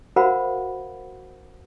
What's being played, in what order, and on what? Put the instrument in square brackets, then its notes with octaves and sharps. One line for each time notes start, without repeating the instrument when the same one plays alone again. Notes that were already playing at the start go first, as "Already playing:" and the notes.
[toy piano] F#4 A#4 C5 F5 F#5 B5